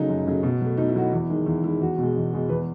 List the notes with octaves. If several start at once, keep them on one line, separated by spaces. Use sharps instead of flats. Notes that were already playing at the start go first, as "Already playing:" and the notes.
Already playing: C#3 F#3 A3 D#4
F#2
C#3 F#3 A3
B2
F#3 A3
B2 D#4
E4
F#3 A3 F#4
E4
E2 E4
D#3 G#3
E2 E4
D#3 G#3 E4
E2 F#4
B2 G#3
E2
B2 G#3
E2 B4